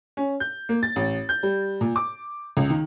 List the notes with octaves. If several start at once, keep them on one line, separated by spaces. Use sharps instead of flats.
C#4
G6
A#3
A6
A1
G6
G3
A#2
D6
C#2
D#3